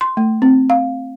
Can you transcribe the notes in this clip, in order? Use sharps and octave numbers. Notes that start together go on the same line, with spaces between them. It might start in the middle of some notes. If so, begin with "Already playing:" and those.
C6
A3
C4
F5